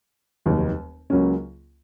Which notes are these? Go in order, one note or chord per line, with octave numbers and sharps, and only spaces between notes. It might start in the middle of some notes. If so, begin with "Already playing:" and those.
F1 D#2 D#3 F#3
C#2 C#3 F#3 A#3 C#4